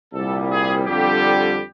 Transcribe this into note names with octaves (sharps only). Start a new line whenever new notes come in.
C2 A#2 G3 A4
G#4
F2 D3 G3 G4